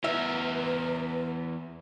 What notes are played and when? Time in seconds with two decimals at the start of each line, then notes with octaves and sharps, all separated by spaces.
0.04 E2 A#4 B4 E5